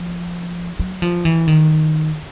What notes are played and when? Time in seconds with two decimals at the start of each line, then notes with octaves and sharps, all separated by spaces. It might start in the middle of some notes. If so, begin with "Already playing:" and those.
Already playing: F3
0.80 F#3
1.02 F3
1.25 E3
1.48 D#3